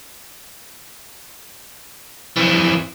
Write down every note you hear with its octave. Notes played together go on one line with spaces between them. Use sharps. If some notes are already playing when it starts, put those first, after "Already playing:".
F2 E3